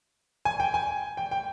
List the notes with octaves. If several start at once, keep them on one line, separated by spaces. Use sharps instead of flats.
G#5
G5
G#5
G5
G5